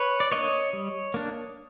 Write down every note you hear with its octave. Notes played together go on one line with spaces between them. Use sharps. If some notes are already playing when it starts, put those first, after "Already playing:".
Already playing: B4 C#5
D5
A#3 D4 C#5 D#5
G3
A#3 D4